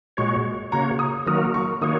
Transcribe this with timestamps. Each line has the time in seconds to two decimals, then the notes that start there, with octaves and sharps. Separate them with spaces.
0.17 A#2 G#3 F#4 C#5 C#6
0.72 C#3 A#3 F#4 C#5 A#5
0.99 D#6
1.26 D#3 F#3 A#3 F#4 A#4 D#6
1.54 C#6
1.81 D#3 A#3 F#4 C#5 D#6